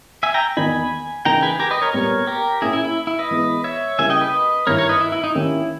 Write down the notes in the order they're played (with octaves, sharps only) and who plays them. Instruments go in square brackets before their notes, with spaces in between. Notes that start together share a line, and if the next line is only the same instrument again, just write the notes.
[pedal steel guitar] E5 G#5
G5 A#5
[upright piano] E2 D#3 A#3 D#4 [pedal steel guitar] G#5 B5
[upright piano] C#3 E3 A#3 D#4 [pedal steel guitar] G5 A#5
[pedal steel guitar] G#4 B4
G4 A#4
B4 D#5
A#4 C#5
[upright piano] A#2 G3 B3 G4 [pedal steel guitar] A#4 C#5
[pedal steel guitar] G4 A#4
[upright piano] A#2 A#3 C#4 [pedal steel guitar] E4 G#4
[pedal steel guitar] E4
E4
E4
B4 D#5
[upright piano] E3 G#3 B3 E4
[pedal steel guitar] C#5 E5
[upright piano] C#3 G3 A#3 E4 G4 [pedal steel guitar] E5 G#5
[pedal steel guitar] D#5 G5
B4 D#5
[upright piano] G2 D#3 A#3 E4 G4 [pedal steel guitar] A#4 C#5
[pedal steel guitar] A#4 C#5
B4 D#5
E4
E4
D#4
[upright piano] D#3 A#3 C#4 G4 [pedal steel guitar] E4